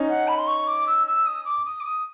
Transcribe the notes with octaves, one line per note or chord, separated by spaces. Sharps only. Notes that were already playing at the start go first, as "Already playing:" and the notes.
Already playing: C#4 D#4
F#5
B5
C6
C#6
D6
E6
E6
D#6
D6
D#6
D6
D#6